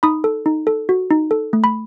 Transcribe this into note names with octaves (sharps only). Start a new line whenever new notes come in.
D#4 B5 D#6
A4
D#4
A4
F#4
D#4
A4
A3
B5